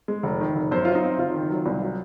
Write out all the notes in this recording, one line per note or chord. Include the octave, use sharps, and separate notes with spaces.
G#3
F1
D#3
F1
F#2 C5
F#3 F4
D#4
C4
F#1 F4
D#3
F#3
C2
F#3